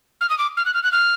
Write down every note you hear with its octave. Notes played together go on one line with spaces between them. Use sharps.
F6
D#6
D6
F6
F#6
F6
F#6
F6